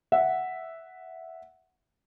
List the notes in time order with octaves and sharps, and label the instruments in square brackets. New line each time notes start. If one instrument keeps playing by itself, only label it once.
[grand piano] E5 F#5